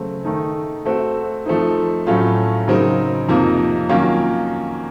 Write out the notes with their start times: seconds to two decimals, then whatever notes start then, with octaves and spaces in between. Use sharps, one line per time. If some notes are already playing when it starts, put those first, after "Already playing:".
Already playing: C#3 F#3 A3 C4 F#4
0.25 D#3 A3 D#4
0.85 A3 C4 F#4
1.46 F3 A3 C4 D#4
2.07 A2 F#3 A3 C#4 F4
2.68 C#3 F#3 C4 D#4 A#4
3.28 F2 C3 F3 A#3 D#4
3.89 D#3 F#3 A#3 C#4 F4